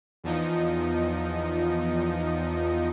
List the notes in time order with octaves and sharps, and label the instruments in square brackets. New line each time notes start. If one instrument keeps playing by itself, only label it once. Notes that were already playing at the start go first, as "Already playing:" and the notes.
[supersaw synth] E2 F3 D#4